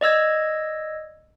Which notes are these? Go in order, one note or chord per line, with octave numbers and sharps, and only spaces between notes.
D5 D#5 E6 G#6